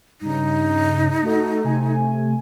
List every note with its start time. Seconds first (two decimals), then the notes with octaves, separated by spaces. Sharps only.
0.21 G2 C#3 D#4
1.22 A3 F#4 A4
1.64 C3 A3 G#5